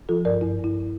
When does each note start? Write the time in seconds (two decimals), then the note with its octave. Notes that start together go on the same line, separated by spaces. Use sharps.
0.09 F3 F4 A4
0.25 G2 A#4 D5
0.41 G2 E4
0.59 G2 E4